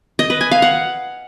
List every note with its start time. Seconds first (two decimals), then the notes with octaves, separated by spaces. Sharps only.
0.19 D#5
0.30 B4
0.41 G#5
0.51 F5
0.62 F#5